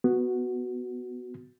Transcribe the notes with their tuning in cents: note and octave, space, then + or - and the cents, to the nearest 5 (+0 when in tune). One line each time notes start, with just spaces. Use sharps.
B3 +0 F#4 +0